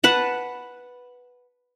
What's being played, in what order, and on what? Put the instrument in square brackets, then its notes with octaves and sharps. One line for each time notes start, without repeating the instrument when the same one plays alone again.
[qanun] B4 F#5 A5